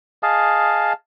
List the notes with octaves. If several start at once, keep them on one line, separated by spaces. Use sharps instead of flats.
G#4 D#5 F5 A5